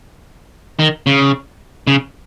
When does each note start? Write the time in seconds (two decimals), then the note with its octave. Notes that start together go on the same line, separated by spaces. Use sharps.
0.79 D#3
1.07 C#3
1.87 C#3